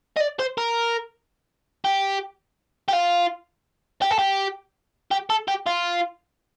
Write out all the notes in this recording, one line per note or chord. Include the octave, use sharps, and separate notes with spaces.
D#5
D5
C5
A#4
G4
G4
F4
G4
A4
G4
G4
A4
G4
F4